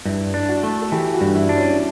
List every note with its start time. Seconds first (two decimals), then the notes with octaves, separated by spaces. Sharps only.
0.05 G2 E4
0.34 D4
0.48 F#4
0.63 A3
0.81 A4
0.92 E3 G4
1.13 F#4
1.21 G2
1.35 E4
1.49 D4
1.57 C#4